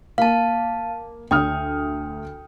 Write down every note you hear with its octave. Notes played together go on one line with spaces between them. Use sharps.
A#3 F5 A5
D2 G5 D#6 F6